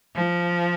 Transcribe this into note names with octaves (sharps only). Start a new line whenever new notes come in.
F3